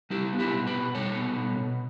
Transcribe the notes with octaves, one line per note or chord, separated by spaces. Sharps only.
G3 E4 G4
B3
E4 G4
B2
G4 B4
B2
G3 A4 C#5
B3
B2
B2